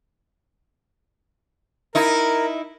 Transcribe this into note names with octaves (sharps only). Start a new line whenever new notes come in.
D#4 E4 A#4